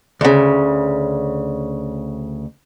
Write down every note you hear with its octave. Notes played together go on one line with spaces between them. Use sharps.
D2 C#3